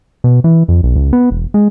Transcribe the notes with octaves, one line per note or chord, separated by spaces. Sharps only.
B2
E3
F2
B1
C#2
B3
E1
G#3